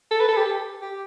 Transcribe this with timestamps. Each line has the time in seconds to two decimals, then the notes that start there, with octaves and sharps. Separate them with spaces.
0.11 A4
0.20 B4
0.28 A4
0.37 G4
0.81 G4